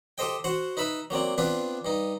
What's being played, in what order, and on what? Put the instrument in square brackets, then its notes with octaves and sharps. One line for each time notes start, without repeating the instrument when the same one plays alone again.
[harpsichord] G4 A4 C5 D#5 G5
F#4 C5 F#5
D#4 B4 E5 B5
F#3 A#3 C4 D5
B3 C4 D4 F4 B4
G2 D#4